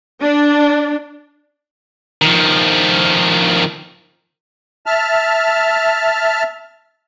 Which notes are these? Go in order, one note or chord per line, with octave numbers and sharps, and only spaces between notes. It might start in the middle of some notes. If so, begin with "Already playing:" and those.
D4
D#3 F3
E5 A5 F6